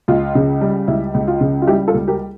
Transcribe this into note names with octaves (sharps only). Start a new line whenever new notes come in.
C#2 F4
C#3
G3
C#2 E4
C#2
F4
C#3
F4
G3 E4 G4
F4 A4
C#2
G4 A#4